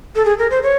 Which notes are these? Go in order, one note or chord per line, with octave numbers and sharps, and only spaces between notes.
A4
G#4
A#4
C5
C#5